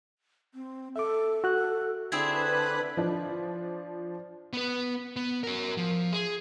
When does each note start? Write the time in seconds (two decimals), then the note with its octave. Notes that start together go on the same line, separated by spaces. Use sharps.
0.54 C4
0.96 A4 E5 D6
1.44 F#4 F#6
2.12 D3 C4 E4 G#4 B4 B5 F#6 G#6
2.97 F3 D4
4.53 B3 B4
5.16 B3
5.44 F#4 A#4
5.78 F3
6.12 G#4